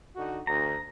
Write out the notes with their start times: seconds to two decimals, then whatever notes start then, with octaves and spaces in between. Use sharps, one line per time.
0.16 D3 D#4 F#4
0.47 D2 A#5